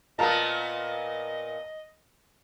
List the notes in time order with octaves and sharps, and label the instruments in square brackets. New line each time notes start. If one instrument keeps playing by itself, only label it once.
[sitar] A#2 A#3 B3 [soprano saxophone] D#5 [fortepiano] A5 A#5